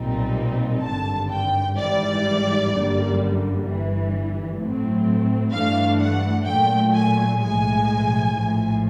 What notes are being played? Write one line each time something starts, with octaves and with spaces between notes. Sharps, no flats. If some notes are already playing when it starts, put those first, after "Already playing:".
Already playing: B1 A#2 G3 C4 D#4
G#1 G2 D3 A5
G5
G#1 G#2 E3 G3 D5
G1 F#2 D3 G3 A#3
G1 G2 E3
A2 F#3 A3 C4
G2 E3 A3 D4 F5
F#5
A#2 F#3 A3 G5
G#5
B1 A2 F3 G#3 G#5
A#1 A2 F3